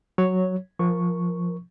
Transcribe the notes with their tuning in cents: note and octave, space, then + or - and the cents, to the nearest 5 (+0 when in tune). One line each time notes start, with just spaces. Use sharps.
F#3 +0 C#5 +0
F3 +0 A#4 +10 C#6 +0